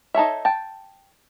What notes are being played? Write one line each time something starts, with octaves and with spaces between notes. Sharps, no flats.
D#4 A4 C#5 E5
G5 A5